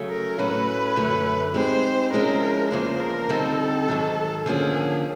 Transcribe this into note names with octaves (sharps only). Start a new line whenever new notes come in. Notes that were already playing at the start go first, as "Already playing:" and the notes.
Already playing: C#3 F#3 A3
A#4
A2 F#3 A3 C#4 F#4 B4
F#2 D3 F#3 A3
G#3 C4 D#4 G4 C5
C#3 F3 G#3 C#4 E4 A#4
E2 C#3 F3 A#3 D4 C5
A#4
D3 G3 C4 D#4 A4
G#2 D#3 F#3
D3 F3 A#3 C#4 G#4